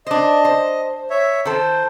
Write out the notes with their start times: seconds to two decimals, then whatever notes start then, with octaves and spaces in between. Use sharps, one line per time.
0.07 D4 C5 D#5
0.45 C5
1.10 C#5 E5
1.45 D#3 A4 C5